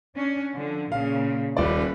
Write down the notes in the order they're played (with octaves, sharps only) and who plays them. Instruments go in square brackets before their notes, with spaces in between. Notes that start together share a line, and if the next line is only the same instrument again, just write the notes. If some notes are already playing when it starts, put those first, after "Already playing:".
[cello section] C#4 D4
D3 F3
[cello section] A#2 C#3 [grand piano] F5
[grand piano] D#1 D5 [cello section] C#4 B4